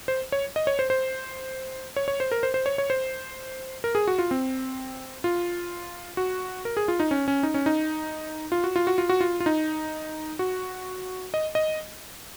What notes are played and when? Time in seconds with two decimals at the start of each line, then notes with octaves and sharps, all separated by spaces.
0.08 C5
0.32 C#5
0.56 D#5
0.67 C#5
0.79 C5
0.90 C5
1.96 C#5
2.08 C#5
2.20 C5
2.32 A#4
2.43 C5
2.54 C5
2.66 C#5
2.78 C#5
2.90 C5
3.84 A#4
3.95 G#4
4.08 F#4
4.19 F4
4.31 C4
5.24 F4
6.17 F#4
6.65 A#4
6.77 G#4
6.88 F4
7.00 D#4
7.11 C#4
7.28 C#4
7.43 D#4
7.54 C#4
7.66 D#4
8.52 F4
8.64 F#4
8.76 F4
8.87 F#4
8.98 F4
9.09 F#4
9.21 F4
9.40 F4
9.46 D#4
10.39 F#4
11.34 D#5
11.55 D#5